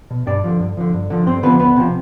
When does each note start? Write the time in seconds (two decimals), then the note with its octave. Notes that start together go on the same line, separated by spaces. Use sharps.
0.11 B2
0.27 G2 D4 D5
0.44 D3 F3
0.60 G2
0.77 D3 F3
0.93 G2
1.10 D3 F3
1.27 G2 C4 C5
1.43 D3 F3 B3 B4
1.59 D2 B3 B4
1.76 C3 F3